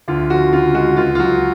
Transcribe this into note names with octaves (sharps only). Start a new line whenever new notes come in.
D2 F4
F3 F#4
C#3 F4
G#3 F#4
C#2 F4
F4
F#3 F#4